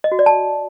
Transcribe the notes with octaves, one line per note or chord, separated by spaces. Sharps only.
D#5
F#4
D5
A5